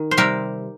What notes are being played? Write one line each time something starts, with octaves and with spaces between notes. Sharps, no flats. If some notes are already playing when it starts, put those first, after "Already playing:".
Already playing: D#3
C5
C3 G3 C4 G4 A#4